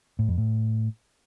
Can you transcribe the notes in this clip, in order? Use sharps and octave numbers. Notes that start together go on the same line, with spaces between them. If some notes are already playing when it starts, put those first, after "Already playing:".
A2
F2
A2